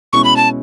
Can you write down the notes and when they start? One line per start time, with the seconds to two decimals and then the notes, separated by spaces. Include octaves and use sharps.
0.13 B2 G#3 C#4 E4 C#6
0.24 B5
0.36 A5